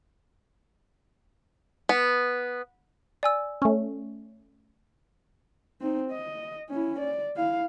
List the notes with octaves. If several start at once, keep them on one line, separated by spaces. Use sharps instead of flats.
B3
D5 G#5 E6
A3 C#4
C4 D#4
D#5
C#4 E4
D5
E4 F5